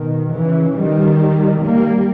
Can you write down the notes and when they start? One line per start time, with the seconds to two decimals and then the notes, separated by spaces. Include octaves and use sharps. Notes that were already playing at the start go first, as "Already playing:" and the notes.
Already playing: B2 D#3
0.33 C#3 E3
0.77 D#3 G3
1.63 G3 A#3